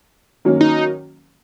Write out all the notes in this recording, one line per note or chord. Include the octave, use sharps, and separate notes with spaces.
D#3 F#3 A#3 C#4
D#4